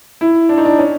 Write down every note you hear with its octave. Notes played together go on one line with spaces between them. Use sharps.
E4
D4
D#4
D4
C#4